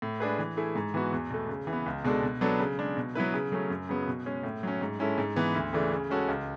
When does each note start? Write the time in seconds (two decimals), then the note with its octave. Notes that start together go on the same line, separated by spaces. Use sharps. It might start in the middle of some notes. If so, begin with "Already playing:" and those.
0.02 A2
0.20 G#3 D4 G#4 B4
0.38 E3
0.57 A3 E4 G#4
0.75 G#2
0.94 E3 B3 F#4
1.13 E2
1.30 B2 A3
1.49 C#3
1.67 E3
1.73 B3
1.86 C#2
2.04 B2 G#3 D4 A4
2.22 B2
2.41 F#3 B3 D4 A4
2.59 C#3
2.78 G#3 D4
2.97 B2
3.15 F#3 B3 E4 B4
3.34 C#3
3.52 F#3 A3 C#4
3.70 F#2
3.89 C#3 F#3 B3
4.07 B2
4.26 G#3 C#4 G#4
4.44 A2
4.63 F#3 C#4
4.81 G#2
4.99 G#3 C#4 E4 A4
5.18 G#2
5.36 E3 B3
5.55 D2
5.73 C#3 E3 A3 D4
5.91 C#3
6.10 G#3 C#4 F#4 A4
6.28 C#2